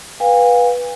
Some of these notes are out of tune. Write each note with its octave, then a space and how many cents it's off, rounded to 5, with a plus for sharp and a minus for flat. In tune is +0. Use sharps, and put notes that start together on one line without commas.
B4 -10 F5 +30 G#5 -40